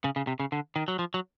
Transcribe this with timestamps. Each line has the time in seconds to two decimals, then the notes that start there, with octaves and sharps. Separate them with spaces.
0.04 C#3
0.16 C#3
0.27 C3
0.40 C#3
0.52 D3
0.76 D#3
0.88 F#3
0.99 F3
1.14 F#3